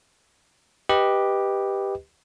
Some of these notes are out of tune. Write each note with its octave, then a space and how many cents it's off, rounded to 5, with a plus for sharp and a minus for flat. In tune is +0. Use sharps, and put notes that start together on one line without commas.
G4 +5 B4 -5 D#5 +10